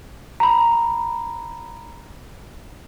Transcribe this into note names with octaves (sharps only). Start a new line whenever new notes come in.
A#5 B5